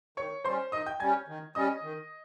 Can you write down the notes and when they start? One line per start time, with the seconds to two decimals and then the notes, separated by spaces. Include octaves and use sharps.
0.17 D#3 C#5 C#6
0.45 G3 C#4 C5 C6
0.72 D#3 D#5 D#6
0.86 G5 G6
1.00 G3 C#4 G#5 G#6
1.28 D#3
1.55 G3 C#4 D#5 D#6
1.83 D#3